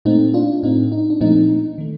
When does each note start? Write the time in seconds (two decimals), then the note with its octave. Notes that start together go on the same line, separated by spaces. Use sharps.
0.05 A#2 A3 C4 D#4
0.34 D4 F4
0.63 A2 A3 C4 D#4
0.92 D#4
1.10 D4
1.21 A#2 F3 A3 C4 D#4
1.78 D#3 A3